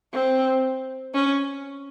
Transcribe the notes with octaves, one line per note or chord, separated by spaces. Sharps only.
C4
C#4